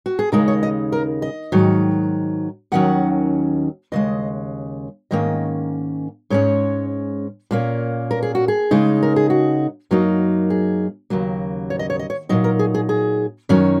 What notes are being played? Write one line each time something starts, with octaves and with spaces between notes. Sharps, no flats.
F#4
G#4
D#2 C#3 G#3 D#4 A#4
C#5
D#5
A#4
D#5
G#2 D#3 F#3
D#2 D#3 F#3 C#4 F#5
D#2 C#3 G#3 D#5
G#2 D#3 A#3 C#4 D#5
G#2 G#3 C#4 C#5
A#2 A#3 C#4
A#4
G#4
F#4
G#4
C#3 G#3 D#4
A#4
G#4
F#4
F#2 F#3 A#3 D#4
G#4
D#2 C#3 F#3 A#3
C#5
D#5
C#5
D#5
C#5
A#2 F#3 D#4 D#5
A#4
G#4
G#4
G#4
F#2 D#3 F#3 C#4